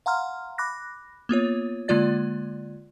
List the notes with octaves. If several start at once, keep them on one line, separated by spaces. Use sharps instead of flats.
F5 F#5 A#5 C6 F6
B5 D6 F#6 A#6
A#3 B3 F4 C#5
D3 G#3 A#3 F4 D5 A6